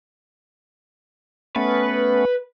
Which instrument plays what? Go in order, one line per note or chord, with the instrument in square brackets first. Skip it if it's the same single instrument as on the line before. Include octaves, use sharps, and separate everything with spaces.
[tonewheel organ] A3 B3 C#4 [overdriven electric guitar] B4